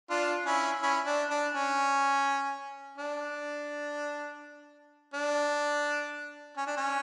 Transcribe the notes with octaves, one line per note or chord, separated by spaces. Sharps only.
D4 F4
C#4 E4
C#4 E4
D4
D4
C#4
D4
D4
C#4
D4
C#4